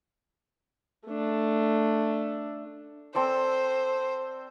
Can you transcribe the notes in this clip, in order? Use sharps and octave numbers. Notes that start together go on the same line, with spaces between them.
A3 D4
C4 A4 C5 D5